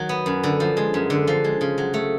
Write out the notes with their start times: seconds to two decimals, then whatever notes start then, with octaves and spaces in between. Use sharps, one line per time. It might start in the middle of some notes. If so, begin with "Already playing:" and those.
Already playing: D#3 F#3
0.09 B3
0.26 F#2
0.43 D3
0.60 F3
0.77 G#3
0.94 F#2
1.10 D3
1.27 F3
1.44 G#3
1.61 C#3
1.78 F#3
1.94 A3